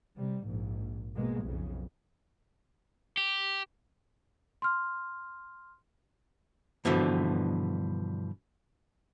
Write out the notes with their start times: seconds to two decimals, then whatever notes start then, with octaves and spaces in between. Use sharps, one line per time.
0.17 C3 G3
0.46 A#1 G#2
1.14 B2 G#3 A#3
1.44 B1 F2 C#3
3.17 G4
4.62 C6 F6
6.85 G2 B2 D3 E3 F3